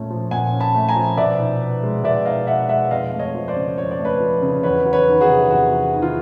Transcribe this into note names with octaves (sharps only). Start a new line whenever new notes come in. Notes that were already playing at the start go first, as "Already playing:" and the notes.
Already playing: A#2 A3 C#4
F3
A#2 F#5 G#5
C#4
A5 B5
A3
G#5 A#5
F3
B2 D5 E5
D#4
B3
G#3
B2 D5 E5
D#4 D#5 F5
B3 E5 F#5
G#3 E5 F#5
F2 D#5 F5
A3
C#5 D#5
F3
C5 D5
C#3
F2 C#5
D5
A3
B4 C#5
F3
C#3
E2 B4 C#5
F#3
B4 C#5
D#3
F#4 G#4
C3
E2 F#4
F#3
D#3
F4